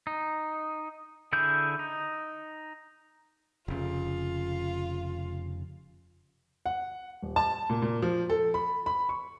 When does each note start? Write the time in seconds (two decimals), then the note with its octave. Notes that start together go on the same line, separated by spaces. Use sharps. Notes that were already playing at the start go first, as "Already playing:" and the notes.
0.07 D#4
1.33 D3 E4 G#4 G6
1.79 D#4
3.68 F1 C#3 F4
6.66 F#5
7.22 D#1
7.36 A5
7.70 A#2
7.82 A#2
8.02 F3
8.30 A4
8.54 B5
8.86 B5
9.09 C#6